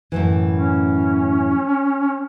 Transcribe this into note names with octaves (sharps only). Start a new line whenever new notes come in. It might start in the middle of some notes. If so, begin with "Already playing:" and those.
F#2 A2 E3
C#4